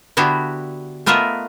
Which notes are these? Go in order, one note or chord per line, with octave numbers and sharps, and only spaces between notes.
D3 B3 D4 E4 F#4 G4
A3 B3 F4 A#4 D#5 E5